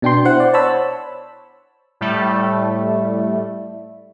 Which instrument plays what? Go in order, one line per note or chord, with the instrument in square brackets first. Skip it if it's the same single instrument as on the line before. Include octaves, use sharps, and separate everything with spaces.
[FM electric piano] B2 D4 G5 C6
E4 C5 F#5
D5
C5 C#5 A5 B5 E6
[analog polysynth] A2 G3 A3